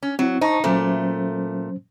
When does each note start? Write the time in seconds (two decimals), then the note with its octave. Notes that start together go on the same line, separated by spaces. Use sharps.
0.03 C#4
0.19 F#3 C4 E4
0.41 D#4 C5 A5 C#6
0.64 A#2 F#3 A3 C#4 C5